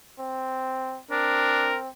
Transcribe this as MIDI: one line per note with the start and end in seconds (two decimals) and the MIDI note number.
0.19 1.00 60
1.11 1.88 60
1.11 1.71 62
1.11 1.79 70